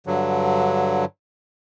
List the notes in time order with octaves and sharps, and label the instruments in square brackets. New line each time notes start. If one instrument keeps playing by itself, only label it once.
[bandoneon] G2 D3 F#3